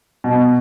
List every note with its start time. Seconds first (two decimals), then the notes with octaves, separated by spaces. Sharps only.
0.24 B2